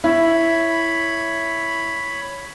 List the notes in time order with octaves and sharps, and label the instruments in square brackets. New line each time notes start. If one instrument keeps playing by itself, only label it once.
[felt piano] E4 E5 [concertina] C#5 B5